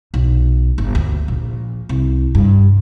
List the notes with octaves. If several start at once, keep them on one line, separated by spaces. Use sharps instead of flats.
B1
G1
D2
A#1
C2
G2